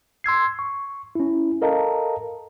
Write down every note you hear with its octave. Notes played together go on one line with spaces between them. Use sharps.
C6 E6 G#6 C7
C#6
C#4 E4
A4 A#4 D#5 F5 A5 A#5